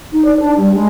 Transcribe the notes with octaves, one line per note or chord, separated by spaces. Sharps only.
D#4
D5
D4
G3
G#3